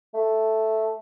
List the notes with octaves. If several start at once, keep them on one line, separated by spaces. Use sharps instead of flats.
A3